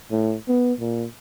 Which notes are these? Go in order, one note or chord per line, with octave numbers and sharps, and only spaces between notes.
A2
B3
A#2